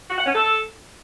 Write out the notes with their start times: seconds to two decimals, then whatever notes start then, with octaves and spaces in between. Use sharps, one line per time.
0.10 F#4
0.18 F#5
0.26 C#4
0.34 A4